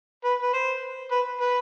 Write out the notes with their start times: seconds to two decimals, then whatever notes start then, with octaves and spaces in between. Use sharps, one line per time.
0.24 B4
0.42 B4
0.53 C5
1.11 B4
1.41 B4